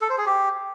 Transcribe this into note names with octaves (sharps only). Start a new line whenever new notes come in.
A4
C5
G#4
G4